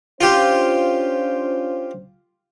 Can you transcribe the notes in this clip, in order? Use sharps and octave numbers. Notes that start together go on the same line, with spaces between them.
C#4 D4 F4 G4 C5